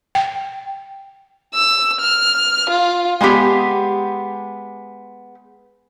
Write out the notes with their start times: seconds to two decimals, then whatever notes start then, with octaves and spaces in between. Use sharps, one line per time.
0.15 G5
1.54 E6
2.00 F6
2.69 F4
3.21 G#3 A#3 B3 G4 G#4